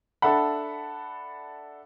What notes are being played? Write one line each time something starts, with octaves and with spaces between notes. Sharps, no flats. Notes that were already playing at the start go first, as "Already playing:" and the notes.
D4 A4 E5 F#5 B5